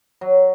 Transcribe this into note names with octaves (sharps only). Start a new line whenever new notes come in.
F#3